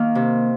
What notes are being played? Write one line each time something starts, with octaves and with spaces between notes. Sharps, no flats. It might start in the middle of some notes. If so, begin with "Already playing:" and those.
Already playing: D#3 A#3
C3